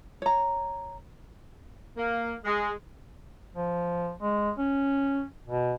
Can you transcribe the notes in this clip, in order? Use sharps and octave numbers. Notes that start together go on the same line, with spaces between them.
C#5 A#5
A#3
G#3
F3
G#3
C#4
B2